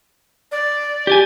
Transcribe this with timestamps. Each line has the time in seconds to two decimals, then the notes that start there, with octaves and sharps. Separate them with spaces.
0.52 D5
1.07 G4 D5 G#5